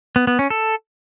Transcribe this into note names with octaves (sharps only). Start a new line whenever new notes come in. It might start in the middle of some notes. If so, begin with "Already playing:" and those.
B3
B3
C#4
A4